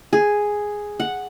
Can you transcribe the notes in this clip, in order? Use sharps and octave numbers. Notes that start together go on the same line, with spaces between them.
G#4
F#5